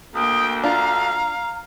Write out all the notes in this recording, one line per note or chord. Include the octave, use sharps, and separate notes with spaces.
D2 A#3 G5 D#6
D4 F4 F5 A#5